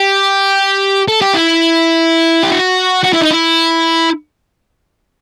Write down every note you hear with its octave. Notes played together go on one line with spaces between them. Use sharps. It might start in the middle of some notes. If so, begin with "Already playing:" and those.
Already playing: G4
A4
G4
E4
G4
F#4
F#4
E4
D#4
E4